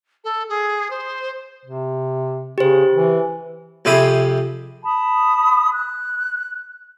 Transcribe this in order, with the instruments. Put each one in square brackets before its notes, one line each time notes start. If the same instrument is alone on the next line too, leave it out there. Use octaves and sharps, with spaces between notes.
[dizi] A4
G#4
C5
[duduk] C3
[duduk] C#3 [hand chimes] G4 C5
[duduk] E3
[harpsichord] F2 C3 G#4 E5 B5
[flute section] A5 B5 D#6
F#6